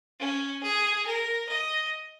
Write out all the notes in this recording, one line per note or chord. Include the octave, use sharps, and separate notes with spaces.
C#4
G#4
A#4
D#5